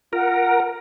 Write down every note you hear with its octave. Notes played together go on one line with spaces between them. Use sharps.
F4 A#4 F#5